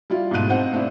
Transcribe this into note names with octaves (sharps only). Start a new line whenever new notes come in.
G3 E4 F4
G#2 B2 A3 F5 F#6 D#7
C4 D#4 C5 F#5
A3 C4 D4 E4